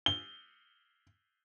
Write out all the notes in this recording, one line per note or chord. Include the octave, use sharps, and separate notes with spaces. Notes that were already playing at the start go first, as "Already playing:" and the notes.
G7